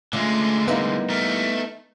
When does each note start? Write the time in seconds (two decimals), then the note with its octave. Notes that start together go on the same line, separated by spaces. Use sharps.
0.13 D3 G#3 A3 C#4 F4
0.68 G3 A#3 B3 D#4 E4
1.10 A3 A#4